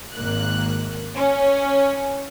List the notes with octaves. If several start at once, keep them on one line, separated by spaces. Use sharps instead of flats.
G#1 A#3 F#6
C#4